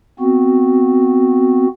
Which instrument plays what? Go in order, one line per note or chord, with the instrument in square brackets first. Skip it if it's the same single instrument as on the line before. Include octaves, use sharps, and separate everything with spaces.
[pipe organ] B3 C4 F#4